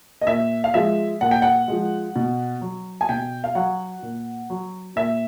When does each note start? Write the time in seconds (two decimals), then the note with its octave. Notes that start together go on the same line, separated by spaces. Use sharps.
0.21 D#5
0.27 A#2 E5
0.64 F5
0.74 F3 G#3 E5
1.21 A#2 F#5
1.31 G5
1.42 F#5
1.68 F3 G#3
2.16 B2
2.61 F#3
3.01 G#5
3.09 B2 G5
3.44 F5
3.55 F#3 F#5
4.03 A#2
4.50 F#3
4.96 A#2 E5